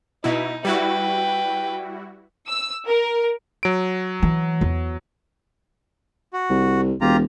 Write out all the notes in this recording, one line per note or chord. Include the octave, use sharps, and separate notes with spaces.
B2 D#4 E4
G3 E4 F#4 B4 G5
E6
A#4
F#3 D7
E3
E2
F#4
C2
E1 F4 G4 A#5